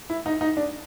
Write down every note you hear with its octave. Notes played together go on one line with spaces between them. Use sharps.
E4
D#4
D#4
D4